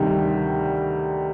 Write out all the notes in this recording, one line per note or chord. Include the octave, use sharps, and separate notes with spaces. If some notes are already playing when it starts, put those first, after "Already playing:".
Already playing: D2 C3 D#3 G3